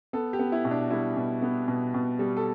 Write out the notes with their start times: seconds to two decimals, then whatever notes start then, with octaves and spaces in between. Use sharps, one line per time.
0.13 B3 A4
0.33 G4
0.39 B3
0.52 E4
0.65 B2
0.71 D4
0.91 G3 E4
1.16 B2
1.42 B3
1.68 B2
1.94 B2
2.19 G3
2.37 A4